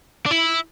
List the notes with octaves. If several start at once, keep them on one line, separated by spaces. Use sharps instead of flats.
D4
E4